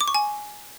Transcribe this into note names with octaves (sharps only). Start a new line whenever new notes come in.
D6
C#6
G#5